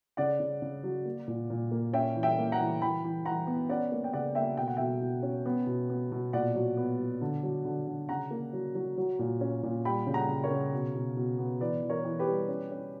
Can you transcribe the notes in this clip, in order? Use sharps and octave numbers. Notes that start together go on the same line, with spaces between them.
C#3 D5 F#5
C#3
C#3
F#3
A#3
A#2
A#2
A#3
C#4 E5 G5
E3
E5 G5
A#3
F#5 A#5
E3
E3 G5 B5
E3
E3 F#5 A#5
B3
C#4 D5 F#5
A#3
G5
C#3 D5 F#5
A#3 E5 G5
B2 G5
F#5
B2 E5 G5
B2
C#4
B3
B2
B3
B2
A#2 D5 F#5
F#3
B3
F#3
D3
F#3
D3
D3
C#3 F#5 A#5
A#3
F#3
F#3
F#3
A#2
C#4
A#2
G3 G5 B5
C#3
F#5 A#5
C#3
A#4 C#5
C#3
B2
B2
B2
B3
E3 B4 D5
E3
A#4 C#5
E3
G4 B4
G3
C#4
C#4